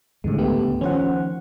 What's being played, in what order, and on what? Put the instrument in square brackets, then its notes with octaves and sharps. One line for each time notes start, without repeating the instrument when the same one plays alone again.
[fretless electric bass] E2 D#3 G3 [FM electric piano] A2 D3 G#3
[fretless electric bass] C#2 G#2 D3 [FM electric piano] A3 B3 G4
[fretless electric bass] D#3 F3 [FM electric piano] C#4 C5 F#5